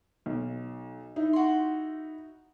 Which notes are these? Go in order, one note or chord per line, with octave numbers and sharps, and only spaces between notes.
B1
D#4 E4
F#4 C6